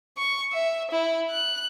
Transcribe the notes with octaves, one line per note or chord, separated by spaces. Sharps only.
C#6
E5
E4
F#6